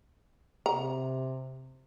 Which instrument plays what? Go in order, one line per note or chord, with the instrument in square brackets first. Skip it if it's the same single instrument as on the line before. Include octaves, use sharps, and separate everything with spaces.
[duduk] C3 [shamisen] A#5